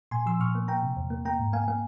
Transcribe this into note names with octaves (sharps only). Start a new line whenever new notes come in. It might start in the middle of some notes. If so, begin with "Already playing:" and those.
A#2 G#5 C6
F3 C6 E6
A#2 C#6 F6
A#3
A#3 G5 A#5
C3
E2
A#3
A#3 G5 A#5
G#2
A#3 F5 G#5
A#3 F5